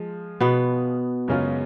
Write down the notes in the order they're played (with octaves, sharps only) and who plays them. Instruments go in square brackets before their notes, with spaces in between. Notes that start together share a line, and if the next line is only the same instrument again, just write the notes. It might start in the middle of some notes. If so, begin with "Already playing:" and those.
Already playing: [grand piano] F3 G#3
[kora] B2 B3
[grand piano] F#2 C#3 G#3 C#4 F4